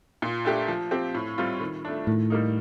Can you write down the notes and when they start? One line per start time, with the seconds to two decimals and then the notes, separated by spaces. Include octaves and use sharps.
0.22 A#2
0.45 A3 D4 G4
0.68 F3
0.91 C4 G4
1.15 A2
1.38 G3 C4 F4
1.60 D#3
1.85 A3 D4
2.07 A2 D#3
2.30 G3 A#3 D#4